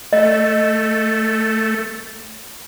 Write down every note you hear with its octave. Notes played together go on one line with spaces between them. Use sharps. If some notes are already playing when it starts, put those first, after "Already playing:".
A3 D#5